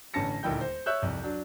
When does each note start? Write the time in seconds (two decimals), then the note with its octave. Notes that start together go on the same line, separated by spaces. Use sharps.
0.14 A1 D3 C#4 A5 A#6 C#7
0.43 D#1 D2 D#3 E4 G5 G6
0.61 C5
0.86 C#5 E5 E6 F#6 G6
1.02 C2 F2
1.23 F#3 D4